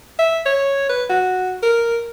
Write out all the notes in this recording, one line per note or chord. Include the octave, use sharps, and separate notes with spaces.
E5
C#5
B4
F#4
A#4